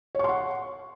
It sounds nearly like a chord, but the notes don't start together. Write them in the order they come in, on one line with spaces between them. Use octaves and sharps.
C#5 C#6 C6 F#5